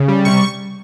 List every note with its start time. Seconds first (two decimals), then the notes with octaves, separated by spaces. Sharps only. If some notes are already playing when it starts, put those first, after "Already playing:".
Already playing: C#3
0.08 G3
0.25 C3 C#6